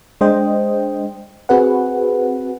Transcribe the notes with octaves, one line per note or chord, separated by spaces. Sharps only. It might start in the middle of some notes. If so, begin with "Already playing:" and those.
G#3 D4 C5 D#5 G5
C4 F#4 G#4 B4 F#5